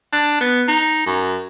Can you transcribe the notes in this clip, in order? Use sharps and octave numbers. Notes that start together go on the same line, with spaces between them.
D4
B3
D#4
F#2